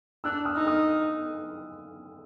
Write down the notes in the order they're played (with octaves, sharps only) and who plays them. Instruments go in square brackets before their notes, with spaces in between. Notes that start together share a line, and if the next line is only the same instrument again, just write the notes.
[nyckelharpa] D4 [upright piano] E6 F#6
[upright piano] D#6 F6
[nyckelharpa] D#4 [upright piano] E6
[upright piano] D#6 F6